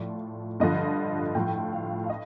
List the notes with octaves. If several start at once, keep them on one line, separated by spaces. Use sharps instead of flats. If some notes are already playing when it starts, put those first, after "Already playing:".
Already playing: A2 F3 D5
G2 D3 F3 D#5
A2 F3 G5
F5
F5
D#5